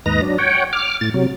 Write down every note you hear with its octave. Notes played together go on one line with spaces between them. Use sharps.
D#2 G#2 B4 D#5 A#5 A#6
F#3 D4
C#5 F#5 G5
D6 F6
A2 A6
C3 F#3